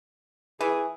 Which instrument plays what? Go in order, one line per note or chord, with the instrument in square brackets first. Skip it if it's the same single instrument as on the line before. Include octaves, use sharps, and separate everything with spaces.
[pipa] E3 [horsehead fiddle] G#4